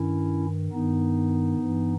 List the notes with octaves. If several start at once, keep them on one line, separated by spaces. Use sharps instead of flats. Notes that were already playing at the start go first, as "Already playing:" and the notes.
Already playing: G2 D#3 C#4 E4
G2 D#3 B3 D#4
G2 E3